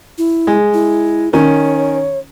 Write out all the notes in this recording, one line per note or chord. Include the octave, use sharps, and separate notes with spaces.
E4
G#3
E4
D#3 C#4 C#5